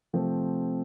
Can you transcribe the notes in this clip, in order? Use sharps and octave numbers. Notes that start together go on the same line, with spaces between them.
C3 F3 A3 C4